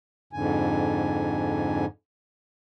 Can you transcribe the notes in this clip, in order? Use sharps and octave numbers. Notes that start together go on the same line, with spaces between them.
F2 G#2 D3 G#5